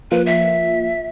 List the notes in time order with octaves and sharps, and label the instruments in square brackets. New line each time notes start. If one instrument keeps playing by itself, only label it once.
[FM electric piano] F3 A#3 F4 [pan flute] B4
[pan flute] E5